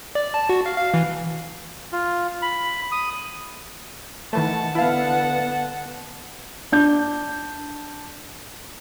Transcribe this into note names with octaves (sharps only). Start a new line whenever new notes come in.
D5
A5
F#4
F5
F5
E3
F4
B5
D#6
D#3 E3 A3 F#5 A5
D3 B3 E4 F5 F#5 A5
D4 G6